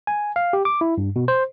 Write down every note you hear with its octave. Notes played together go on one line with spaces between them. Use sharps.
G#5
F5
G4
D6
E4
G2
B2
C5